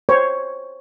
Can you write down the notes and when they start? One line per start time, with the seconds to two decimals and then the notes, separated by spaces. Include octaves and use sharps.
0.09 C5 C#5